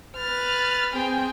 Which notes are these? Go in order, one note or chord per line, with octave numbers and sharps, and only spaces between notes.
B4 F6 A6
C4 G#4 G5